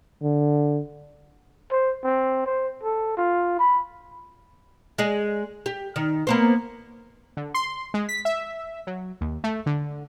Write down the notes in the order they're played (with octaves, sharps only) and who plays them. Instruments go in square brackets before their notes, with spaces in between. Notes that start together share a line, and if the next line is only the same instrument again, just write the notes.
[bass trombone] D3
[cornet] C5
C4
C5
A4
F4
B5
[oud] G#3 G#4 D#5
G4
D#3
A#3 B3 C5
[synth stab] D3
C6
G#3
B6
E5
F#3
D#2
A3
D3